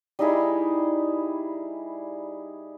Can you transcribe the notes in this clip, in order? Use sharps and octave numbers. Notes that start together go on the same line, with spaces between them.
G3 D#4 E4 G#4